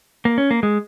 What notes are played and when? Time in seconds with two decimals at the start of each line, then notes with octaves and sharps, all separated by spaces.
0.25 A#3
0.38 C#4
0.51 A#3
0.63 G#3